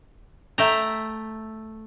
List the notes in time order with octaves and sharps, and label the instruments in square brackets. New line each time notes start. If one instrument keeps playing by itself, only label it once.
[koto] A3 E5 G5 A#5